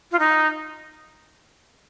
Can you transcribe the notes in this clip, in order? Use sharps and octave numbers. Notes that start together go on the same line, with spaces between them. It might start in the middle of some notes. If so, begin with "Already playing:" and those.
F4
D#4